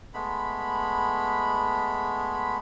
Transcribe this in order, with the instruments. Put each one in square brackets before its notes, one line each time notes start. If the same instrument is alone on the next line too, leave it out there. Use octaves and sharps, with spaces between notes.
[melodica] G#3 A3 B3 B5